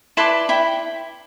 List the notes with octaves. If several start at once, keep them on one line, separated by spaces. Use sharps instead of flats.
E4 B4 D5 A5 C6
E4 G5 B5